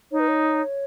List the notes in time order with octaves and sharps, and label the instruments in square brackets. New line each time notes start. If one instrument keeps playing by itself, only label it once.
[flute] D#4 [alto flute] C#5
[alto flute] B4
C#5